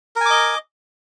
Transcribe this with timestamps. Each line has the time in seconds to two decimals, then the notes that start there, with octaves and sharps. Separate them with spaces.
0.16 A#4
0.21 G#5
0.26 D6
0.30 D#5